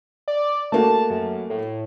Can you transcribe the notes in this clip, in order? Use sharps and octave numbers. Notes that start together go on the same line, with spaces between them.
D5
A3 A#3 F#4 A5
F#2
A2